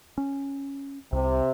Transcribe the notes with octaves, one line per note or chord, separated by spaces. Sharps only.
C#4
C2 C3